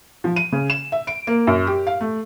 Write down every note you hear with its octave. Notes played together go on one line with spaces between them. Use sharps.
F3
D#7
C#3
E7
E5
D7
A#3
F#2
G4
F5
A3